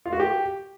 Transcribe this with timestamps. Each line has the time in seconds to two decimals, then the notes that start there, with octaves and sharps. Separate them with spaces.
0.06 F4
0.13 F#4
0.20 G4